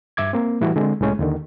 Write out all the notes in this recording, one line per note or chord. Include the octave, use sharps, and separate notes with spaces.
G2 E5 D6 G#6
A#3 C4
A2 E3 G3 E4 F#4
D3 G#3 C4
C2 A2 G#3 C#4
D#2 D3 D#3